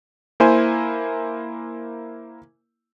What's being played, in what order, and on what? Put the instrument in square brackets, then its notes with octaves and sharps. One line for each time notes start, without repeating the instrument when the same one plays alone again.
[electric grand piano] A#3 E4 C5 G#5